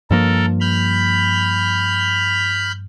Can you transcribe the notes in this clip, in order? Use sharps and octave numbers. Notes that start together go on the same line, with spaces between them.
G2 F3 A#3 A4 A#4
B5 F6 G6